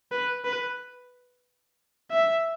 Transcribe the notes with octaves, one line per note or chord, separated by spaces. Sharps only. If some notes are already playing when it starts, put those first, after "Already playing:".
B4
B4
E5